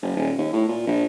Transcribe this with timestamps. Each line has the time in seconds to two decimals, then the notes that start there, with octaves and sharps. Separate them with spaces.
0.02 F#1
0.16 D#1
0.38 D#2
0.53 A2
0.68 A#2
0.87 A#1